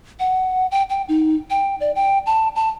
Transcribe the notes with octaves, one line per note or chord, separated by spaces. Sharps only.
F#5
G5
G5
D#4
G5
D5
G5
A5
A5